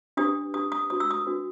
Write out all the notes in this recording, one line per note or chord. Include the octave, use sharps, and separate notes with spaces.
D4 G4 B4 D#6
D4 G4 B4 D#6
D#6
D4 F#4 B4 D#6
E6
D#6
D4 F#4 B4